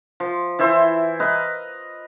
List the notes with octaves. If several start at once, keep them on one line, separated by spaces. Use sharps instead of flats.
F3
E3 E4 C5 E5
A#4 B4 D#5